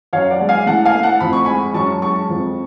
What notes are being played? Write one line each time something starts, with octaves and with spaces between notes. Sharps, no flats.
F#2 C#5 F5
D5 F#5
G#3
F5 G#5
A2 F#5 A5
F5 G#5
A3
F#5 A5
F2 B5
C#6
G#3 G#5 B5
F#2 A5 C#6
G#3 A5 C#6
F2